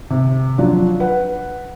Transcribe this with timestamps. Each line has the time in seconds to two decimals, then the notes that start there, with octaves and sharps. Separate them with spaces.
0.10 C3
0.58 F3 F#3 D4 F#4
1.00 B4 F#5